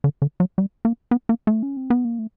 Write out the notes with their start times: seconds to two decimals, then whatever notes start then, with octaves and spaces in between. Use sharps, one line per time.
0.04 D3
0.22 D3
0.40 F#3
0.58 G3
0.85 A#3
1.11 B3
1.29 A#3
1.47 A3
1.63 C#4
1.77 C4
1.90 B3
2.05 A#3
2.19 A3